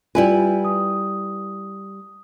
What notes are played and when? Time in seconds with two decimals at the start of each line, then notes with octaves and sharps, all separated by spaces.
0.15 G3 E4 F4 B4 G#5
0.65 D#6